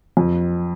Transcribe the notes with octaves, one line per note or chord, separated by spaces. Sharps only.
F2